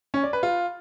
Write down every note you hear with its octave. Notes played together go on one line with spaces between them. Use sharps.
C#4
D5
B4
F4